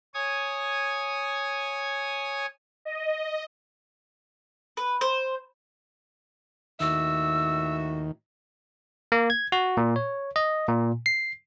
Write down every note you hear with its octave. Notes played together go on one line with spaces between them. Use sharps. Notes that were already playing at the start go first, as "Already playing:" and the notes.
C#5 G#5 D#6
D#5
B4
C5
D#2 A2 D#3 F#4 E5 E6
A#3
G#6
F#4
A#2
C#5
D#5
A#2
C7